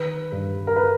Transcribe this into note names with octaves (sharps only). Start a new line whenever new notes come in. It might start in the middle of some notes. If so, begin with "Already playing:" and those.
Already playing: D#3 B4
G2
A#4
B4